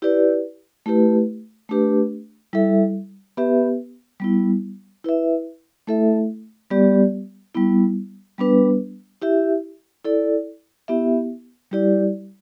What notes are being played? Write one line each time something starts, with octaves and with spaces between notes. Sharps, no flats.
E4 G4 B4 D5
A3 E4 G4 B4
A3 D4 G4 B4
G3 E4 A4 E5
B3 G4 B4 E5
G3 B3 E4
E4 B4 E5
A3 E4 A4 E5
G3 B3 G4 D5
G3 B3 E4
G3 B3 D4 B4
E4 G4 E5
E4 A4 D5
B3 E4 G4 E5
G3 E4 G4 D5